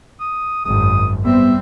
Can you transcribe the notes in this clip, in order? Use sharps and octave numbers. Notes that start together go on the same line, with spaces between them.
D#6
G#1 F#2 D#6
G3 B3 C4 E5